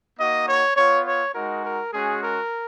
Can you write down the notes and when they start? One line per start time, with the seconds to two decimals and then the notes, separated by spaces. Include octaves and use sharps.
0.18 A#3 D#4 F#4 D#5
0.48 C#5
0.76 B3 F4 C#5
1.06 C#5
1.34 G#3 D#4 F#4 A#4
1.64 A#4
1.93 G#3 C#4 F#4 G#4
2.22 A#4